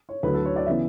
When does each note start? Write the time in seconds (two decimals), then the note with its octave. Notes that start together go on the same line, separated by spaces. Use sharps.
0.09 C#5
0.23 D2 D3 F#3 B4
0.34 A4
0.45 C#5
0.56 D5
0.66 C#3 E3 B3 E5